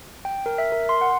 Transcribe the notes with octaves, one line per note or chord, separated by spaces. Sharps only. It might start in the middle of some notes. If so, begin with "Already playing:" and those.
G5
A#4
E5
A#4
C6
F#5